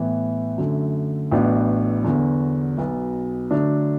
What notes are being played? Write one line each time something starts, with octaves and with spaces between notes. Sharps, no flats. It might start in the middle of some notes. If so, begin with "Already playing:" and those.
Already playing: A2 E3 B3
F#2 D3 A3
A1 A2 F#3 B3 D4
E2 D3 F#3 B3 F#4
B1 B2 B3
D3 F#3 A3 D4